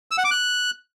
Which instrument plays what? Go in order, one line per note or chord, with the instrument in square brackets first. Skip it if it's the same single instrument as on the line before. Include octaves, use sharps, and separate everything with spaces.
[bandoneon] E6
F#5
D6
F#6